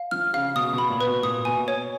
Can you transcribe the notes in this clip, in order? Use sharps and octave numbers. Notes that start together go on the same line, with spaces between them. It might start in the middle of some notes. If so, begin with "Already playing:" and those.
Already playing: F5
F3 F6
C#3 F5
B2 D#6
B2
B5
A#2
B4
B2
A#2 D#6
B2 G#5
C#5